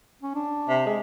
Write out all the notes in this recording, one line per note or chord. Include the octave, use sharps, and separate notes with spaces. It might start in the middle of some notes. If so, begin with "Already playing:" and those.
C#4
D4
C3
G#3